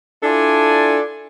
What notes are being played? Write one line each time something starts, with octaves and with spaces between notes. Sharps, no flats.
D4 E4 F4 A4 D5 G#5